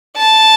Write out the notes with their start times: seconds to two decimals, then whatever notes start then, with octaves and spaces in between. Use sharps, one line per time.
0.17 A5